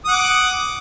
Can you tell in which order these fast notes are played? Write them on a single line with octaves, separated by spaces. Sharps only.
D#6 F#5 D6